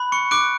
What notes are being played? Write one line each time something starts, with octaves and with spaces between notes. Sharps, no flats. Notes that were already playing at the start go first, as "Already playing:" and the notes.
Already playing: B5 F#6
C#6 C#7
D6 F#6 D7